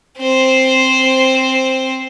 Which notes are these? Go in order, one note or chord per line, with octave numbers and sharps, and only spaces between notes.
C4 C5